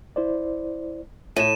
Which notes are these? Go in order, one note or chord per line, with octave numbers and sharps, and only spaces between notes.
E4 C5 D5
A2 D#7 E7